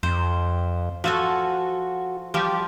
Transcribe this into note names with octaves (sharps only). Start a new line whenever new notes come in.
F2 C5
F3 F#4 A4 G#5
F3 G3 G4